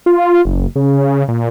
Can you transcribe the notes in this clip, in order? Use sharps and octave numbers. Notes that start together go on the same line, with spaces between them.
F4
F#1
C#3
A#2